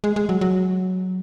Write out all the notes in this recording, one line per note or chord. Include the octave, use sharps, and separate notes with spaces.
G#3
G#3
F#3
F#3